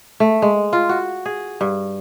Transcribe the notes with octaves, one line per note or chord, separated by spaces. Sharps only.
A3
G#3
F4
F#4
G#4
G2